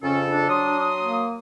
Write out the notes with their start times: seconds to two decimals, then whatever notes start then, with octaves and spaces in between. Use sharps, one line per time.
0.02 F2 C#3 C#4 A4
0.29 D4
0.49 F#3 C6 D#6
1.02 A#3